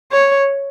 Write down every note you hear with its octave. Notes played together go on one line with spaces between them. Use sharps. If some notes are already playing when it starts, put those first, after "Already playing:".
C#5